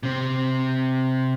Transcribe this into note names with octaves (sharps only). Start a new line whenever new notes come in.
C3 C4